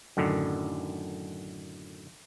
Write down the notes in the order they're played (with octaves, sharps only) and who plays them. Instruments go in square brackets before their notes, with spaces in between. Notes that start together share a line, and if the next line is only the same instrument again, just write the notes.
[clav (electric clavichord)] F#2 A2 D3 D#3